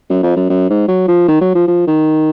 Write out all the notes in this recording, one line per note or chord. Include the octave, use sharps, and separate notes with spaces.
F#2
F2
F#2
F#2
G#2
F#3
F3
D#3
F#3
F3
F3
D#3